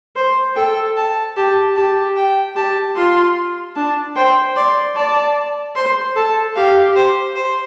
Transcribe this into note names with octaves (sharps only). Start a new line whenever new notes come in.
C5
A4 G5
A5
G4 A5
G4 A5
G5
G4 A5
F4 C6
D4 A5
C5 G5
D5 C6
D5 A5
C5 C6
A4 A5
G4 F5
C5
C5